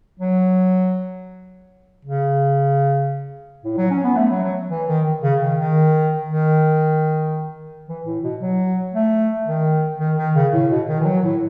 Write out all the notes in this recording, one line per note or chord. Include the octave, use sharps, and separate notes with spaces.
F#3
C#3
A2
F#3
C#4
B3
A3
F#3
F#3
E3
D#3
C#3
D#3
D#3
D#3
E3
A2
B2
F#3
A3
D#3
D#3
D#3
C#3
A2
B2
D#3
E3
F#3
A2